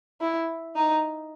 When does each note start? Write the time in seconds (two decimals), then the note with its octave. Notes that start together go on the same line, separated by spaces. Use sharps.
0.21 E4
0.75 D#4